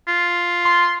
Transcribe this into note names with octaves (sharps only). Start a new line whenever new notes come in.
F4
C6